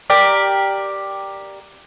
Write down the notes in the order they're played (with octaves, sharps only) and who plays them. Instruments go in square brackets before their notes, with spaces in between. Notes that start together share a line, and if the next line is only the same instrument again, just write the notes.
[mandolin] G4 A#4 D5